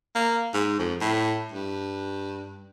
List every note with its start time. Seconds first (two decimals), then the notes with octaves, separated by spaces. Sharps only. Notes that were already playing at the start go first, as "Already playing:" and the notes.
0.15 A#3
0.54 G#2
0.79 F2
1.01 A2
1.52 G2